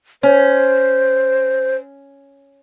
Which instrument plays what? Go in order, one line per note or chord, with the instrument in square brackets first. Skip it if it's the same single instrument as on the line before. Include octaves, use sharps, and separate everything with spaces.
[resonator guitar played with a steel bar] C#4 [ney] C5